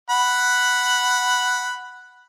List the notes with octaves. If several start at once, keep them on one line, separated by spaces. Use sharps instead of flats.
F#5 B5